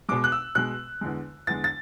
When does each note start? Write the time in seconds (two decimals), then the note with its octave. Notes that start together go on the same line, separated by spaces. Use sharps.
0.09 B2 G#3 D6
0.24 F#6
0.32 E6
0.55 B2 G#3 F#6
1.01 E2 D3 G#3
1.47 E2 D3 G#3 A6
1.64 A6